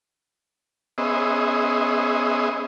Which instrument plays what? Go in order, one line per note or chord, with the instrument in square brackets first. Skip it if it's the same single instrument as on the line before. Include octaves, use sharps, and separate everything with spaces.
[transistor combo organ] B3 C#4 G#4 C5 D#5 E5